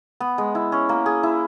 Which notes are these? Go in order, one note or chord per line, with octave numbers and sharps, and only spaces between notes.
B3
G#3
E4
C#4
A#3
G#4
E4